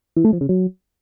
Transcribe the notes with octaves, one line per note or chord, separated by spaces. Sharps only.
E3
A3
F3
C#3
F#3